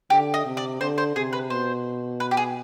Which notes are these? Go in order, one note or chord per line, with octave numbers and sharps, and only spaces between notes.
D3 G4
D#5
C3
D5
D3 C5
C5
C3 G#4
B4
B2 C5
B4
G4
G#4